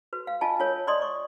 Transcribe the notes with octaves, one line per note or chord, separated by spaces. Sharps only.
F#4 B4
F5
F4 D#5 G#5 A5
F4 A#4 C#5 D#5
D5 D#5 C6 D#6
C#6